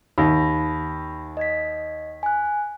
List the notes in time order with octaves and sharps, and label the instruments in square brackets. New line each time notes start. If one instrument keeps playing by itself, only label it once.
[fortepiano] D#2 [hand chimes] B5 A#6
[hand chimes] D#5 G#6 B6
G#5 F#6